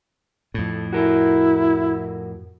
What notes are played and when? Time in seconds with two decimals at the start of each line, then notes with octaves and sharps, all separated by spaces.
0.54 F2 A2
0.93 E4 F#4 A#4